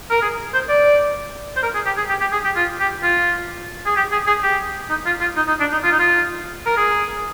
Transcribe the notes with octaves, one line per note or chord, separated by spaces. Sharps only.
A#4
G#4
C5
D5
C5
A#4
G#4
G4
G#4
G4
G4
G#4
G4
F4
G4
F4
G#4
G4
G#4
G#4
G4
D#4
F4
F4
D#4
D#4
D4
D#4
F4
D#4
F4
A#4
G#4